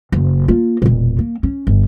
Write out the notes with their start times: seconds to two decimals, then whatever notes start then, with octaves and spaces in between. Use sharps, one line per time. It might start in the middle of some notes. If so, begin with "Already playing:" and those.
0.12 F#1
0.48 A#3 F4
0.82 E1 A#2
1.19 A#3
1.43 C#4
1.67 G1